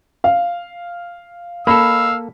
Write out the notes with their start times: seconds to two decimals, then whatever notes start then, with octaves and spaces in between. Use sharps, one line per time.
0.24 F5
1.67 A#3 A4 F5 B5 E6